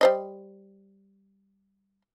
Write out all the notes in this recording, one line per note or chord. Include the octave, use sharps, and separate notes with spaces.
G3 C5 D#5